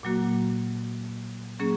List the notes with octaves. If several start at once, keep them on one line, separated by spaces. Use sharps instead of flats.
A#2 F#3 A#3 F#4
F#3 A#3 C#4 G#4